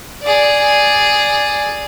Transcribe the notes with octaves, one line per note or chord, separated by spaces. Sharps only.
G#4 D5